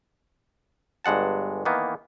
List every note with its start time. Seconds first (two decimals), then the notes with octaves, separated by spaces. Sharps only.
1.04 G1 G2 G#3 F#5 A5
1.65 D#3 E3 A#3 B3